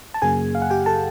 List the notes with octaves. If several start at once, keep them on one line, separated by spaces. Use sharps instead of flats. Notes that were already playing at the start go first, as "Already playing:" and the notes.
A5
F#2 C#3 F#3 A#3 G#4 G#5
F5
F#5
G4 G5
A4 A5